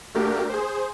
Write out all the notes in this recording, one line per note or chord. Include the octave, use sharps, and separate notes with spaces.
A3 A#3 D4 F#4 G4 A#4
G#4 C5